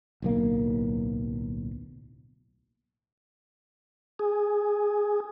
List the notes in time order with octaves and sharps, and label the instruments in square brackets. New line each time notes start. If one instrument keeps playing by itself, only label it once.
[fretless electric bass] D1 B1 A#3
[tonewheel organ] G#4